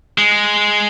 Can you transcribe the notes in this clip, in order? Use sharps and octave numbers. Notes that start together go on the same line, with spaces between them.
G#3